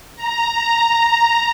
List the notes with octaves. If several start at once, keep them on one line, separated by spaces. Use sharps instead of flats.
A#5